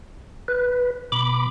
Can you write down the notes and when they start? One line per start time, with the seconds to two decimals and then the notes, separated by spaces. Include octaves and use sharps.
0.48 B4
1.12 B2 B5 D6